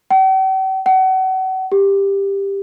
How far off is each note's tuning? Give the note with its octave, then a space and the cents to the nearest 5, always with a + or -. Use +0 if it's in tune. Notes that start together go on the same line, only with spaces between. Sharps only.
G5 -45
F#5 +35
G4 +10